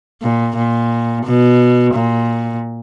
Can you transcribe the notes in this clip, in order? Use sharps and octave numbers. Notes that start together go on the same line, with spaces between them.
A#2
A#2
B2
A#2